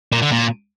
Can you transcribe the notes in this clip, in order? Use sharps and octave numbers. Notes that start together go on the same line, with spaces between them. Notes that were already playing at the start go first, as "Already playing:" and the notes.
A#2
D3
A#2